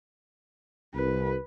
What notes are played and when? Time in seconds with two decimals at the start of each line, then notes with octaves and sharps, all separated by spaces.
0.95 C2 B4